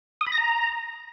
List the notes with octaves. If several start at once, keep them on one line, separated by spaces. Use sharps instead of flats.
D#6
B5
A#6
A#5